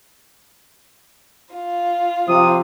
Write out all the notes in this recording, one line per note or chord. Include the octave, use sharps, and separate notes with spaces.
F4
C3 F3 D#6